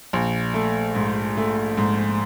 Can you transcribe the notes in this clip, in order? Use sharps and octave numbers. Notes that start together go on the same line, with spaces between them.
A#1
A3
G#2
A3
G#2